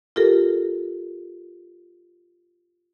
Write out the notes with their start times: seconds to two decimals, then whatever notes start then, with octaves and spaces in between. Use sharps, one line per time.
0.16 F4 G4 A4 A#4